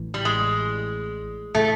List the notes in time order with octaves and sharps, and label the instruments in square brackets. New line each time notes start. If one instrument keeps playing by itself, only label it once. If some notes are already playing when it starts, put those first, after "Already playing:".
Already playing: [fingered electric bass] A1 A2 E3
[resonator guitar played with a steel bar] G3
G#3
[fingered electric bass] A2 E3 [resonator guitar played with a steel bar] A3